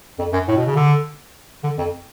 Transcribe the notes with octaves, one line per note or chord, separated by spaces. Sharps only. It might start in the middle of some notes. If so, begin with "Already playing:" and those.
F2
F#2
A2
B2
C#3
D3
D3
F2